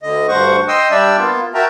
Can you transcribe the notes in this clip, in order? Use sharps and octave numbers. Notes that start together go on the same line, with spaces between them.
D2 D3 D#5
D2 G2 C5 F#5 C#6
D#5 G5 C6 D#6 E6
G3 D4 D5 E5 G5 E6
A#3 B3 F4
F#4 A#4 E5 G5 A5 A#5